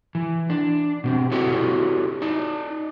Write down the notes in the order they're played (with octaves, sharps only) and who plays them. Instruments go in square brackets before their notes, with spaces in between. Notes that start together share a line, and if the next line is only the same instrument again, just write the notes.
[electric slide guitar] E3
D4
B2 A#3 C4
E4 F#4 G4 A4 C#5 D#5
D#4 D5